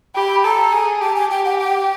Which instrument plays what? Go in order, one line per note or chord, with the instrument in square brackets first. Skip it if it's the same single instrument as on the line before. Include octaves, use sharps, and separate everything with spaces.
[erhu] G4 [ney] B5
[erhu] A4 [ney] A#5
[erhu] G#4
[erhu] G4 [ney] A5
[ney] G#5
[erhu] G4 [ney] G5
[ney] F#5
G5